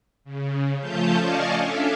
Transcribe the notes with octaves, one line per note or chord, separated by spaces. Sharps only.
C#3
F3 A3 C#4 F4 A5 G6
D5 D#5 F5 G#5 A5 C#6
C#4 D4 A4 E5 F5